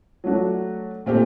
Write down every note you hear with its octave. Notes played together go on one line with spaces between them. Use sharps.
F#3 A3 D4 F#4
A#2 A3 C4 G4